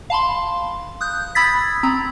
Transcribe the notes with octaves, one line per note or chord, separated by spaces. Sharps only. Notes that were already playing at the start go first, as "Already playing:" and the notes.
F5 A5 B5 C6
D#6 F#6 G6
B5 D#6 E6 G#6 A6 B6
C4 A#5 B5